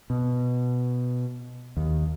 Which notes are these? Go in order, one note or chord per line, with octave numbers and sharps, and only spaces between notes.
B2
D#2